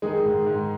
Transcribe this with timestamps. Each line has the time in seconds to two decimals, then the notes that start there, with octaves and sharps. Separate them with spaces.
0.02 D#3 G#3 G#4
0.25 G#2
0.46 G#2